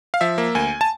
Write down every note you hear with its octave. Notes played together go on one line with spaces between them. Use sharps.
F5
F3 E5
A#3
D2 G#5
A5